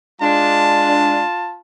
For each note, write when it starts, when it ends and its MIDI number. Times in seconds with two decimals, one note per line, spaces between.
0.22 1.20 56
0.22 1.20 62
0.22 1.59 65
0.22 1.59 81